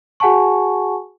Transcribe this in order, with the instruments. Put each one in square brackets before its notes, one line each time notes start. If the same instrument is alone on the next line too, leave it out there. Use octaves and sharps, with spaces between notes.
[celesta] F#4 G#4 F#5 G#5 A5 C#6